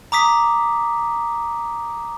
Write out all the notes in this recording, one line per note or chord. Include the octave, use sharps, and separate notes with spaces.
A#5 D6 D#6 B6